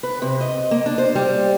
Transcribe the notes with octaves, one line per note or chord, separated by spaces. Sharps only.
B4
C3
D#5
A#3
D4
C5
G3